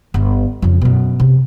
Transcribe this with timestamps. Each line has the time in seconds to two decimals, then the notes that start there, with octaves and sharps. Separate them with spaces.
0.14 G1
0.62 F2 C#3
0.81 F#2 B2
1.20 C3 C4